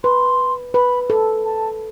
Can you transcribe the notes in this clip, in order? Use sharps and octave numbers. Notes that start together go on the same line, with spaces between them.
B4 C6
B4 B5
A4
A5